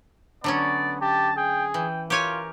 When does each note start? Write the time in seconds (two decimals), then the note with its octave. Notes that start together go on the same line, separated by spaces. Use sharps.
0.44 D3 F#3 B3 C#4 D5
1.01 G4 A5
1.37 G#4 G5
1.74 E3 G5
2.10 F4 G4 A#4 C#5 G#5